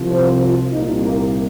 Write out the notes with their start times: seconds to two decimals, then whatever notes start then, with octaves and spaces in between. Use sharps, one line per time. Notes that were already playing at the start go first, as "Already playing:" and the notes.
Already playing: C2 C3 F3
0.11 C5
0.43 F4
0.73 C2 A#2 A#3 D#4
1.04 A#3